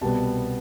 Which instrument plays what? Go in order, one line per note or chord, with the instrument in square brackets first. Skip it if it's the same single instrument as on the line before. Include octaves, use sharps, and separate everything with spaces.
[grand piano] C2 B2 G3 B3 A5